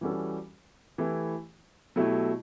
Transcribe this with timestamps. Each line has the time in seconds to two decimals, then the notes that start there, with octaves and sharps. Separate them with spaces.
0.01 E3 G3 C#4 F#4 A4
0.98 E3 A3 E4 G4
1.96 B2 F#3 A3 E4 G4